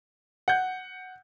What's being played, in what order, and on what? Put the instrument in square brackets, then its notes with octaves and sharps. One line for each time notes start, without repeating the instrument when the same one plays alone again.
[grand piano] F#5 G6